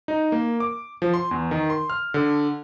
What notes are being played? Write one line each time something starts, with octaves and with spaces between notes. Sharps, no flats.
D#4
A#3
D6
F3
C6
E2
D#3
C6
F6
D3